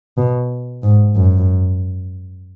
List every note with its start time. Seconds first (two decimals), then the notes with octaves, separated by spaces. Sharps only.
0.18 B2
0.83 G#2
1.16 F#2